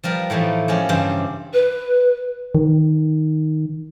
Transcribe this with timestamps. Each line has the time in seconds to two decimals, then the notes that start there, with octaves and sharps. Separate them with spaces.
0.03 F3 G3 A#4 B4
0.30 A2 E3 F3 A3 D#4
0.68 F3 G#3 C#4 G4
0.89 G2 C#3 E3 G4 C5
1.53 B4
2.55 D#3